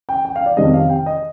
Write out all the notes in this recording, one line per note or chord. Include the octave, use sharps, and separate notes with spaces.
G5
G5
F5
D5
F2 C3 D#3 G3 D#5
F5
G5
D#5